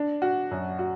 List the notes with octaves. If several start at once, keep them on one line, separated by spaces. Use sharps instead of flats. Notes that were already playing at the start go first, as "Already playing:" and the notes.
Already playing: D4
F#4
F#2
F#4